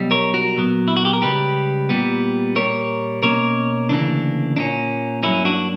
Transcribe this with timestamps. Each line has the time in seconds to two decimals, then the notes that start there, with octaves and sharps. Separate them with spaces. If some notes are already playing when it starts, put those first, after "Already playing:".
Already playing: B1 B2 G3
0.11 A#4 C#5
0.34 F#4 A#4
0.56 A#2 F#3 B3
0.88 E4
0.97 F#4
1.05 G4
1.13 A#4
1.22 C#2 C#3 G3 G4 B4
1.89 A#2 G3 B3
2.56 A#2 G3 A#3 A#4 C#5
3.23 B2 A#3 C#4 A#4 C#5
3.89 D2 C#3 E3 A#3 D4
4.56 A#2 A#3 C#4 D4
5.23 G2 F#3 A#3 C#4 E4
5.45 D4 F#4